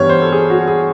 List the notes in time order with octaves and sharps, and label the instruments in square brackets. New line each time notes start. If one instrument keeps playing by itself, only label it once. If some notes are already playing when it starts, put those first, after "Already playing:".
Already playing: [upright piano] G2 E3 G3 B3 C#5
C5
A4
G#4
F#4
G#4